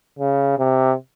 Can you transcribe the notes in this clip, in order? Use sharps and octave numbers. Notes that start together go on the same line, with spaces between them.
C#3
C3